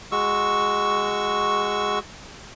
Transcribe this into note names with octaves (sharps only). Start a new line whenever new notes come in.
G#3 F#4 C#6 E6